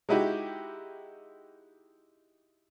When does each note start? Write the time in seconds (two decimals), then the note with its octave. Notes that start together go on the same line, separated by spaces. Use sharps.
0.09 G#3 D#4 E4 F#4 G4